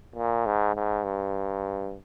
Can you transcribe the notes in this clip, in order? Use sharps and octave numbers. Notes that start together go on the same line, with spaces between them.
A#2
G#2
G#2
G2